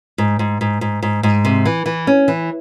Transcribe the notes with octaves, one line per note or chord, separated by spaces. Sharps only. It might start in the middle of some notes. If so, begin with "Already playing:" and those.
G#2
G#2
G#2
G#2
G#2
G#2
C3
E3
E3
C#4
E3